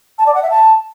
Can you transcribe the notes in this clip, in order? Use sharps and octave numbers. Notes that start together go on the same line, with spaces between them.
A5
D5
F#5
E5
A5